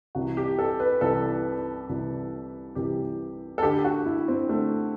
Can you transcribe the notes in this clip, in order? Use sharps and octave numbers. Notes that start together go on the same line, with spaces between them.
C2 C3 E3 F#4
G4
A4
B4
C2 C3 E3 A4
C2 C3 E3
C2 C3 E3 G4
A4
D2 D3 G4
F#4
E4
C4
D2 D3 A3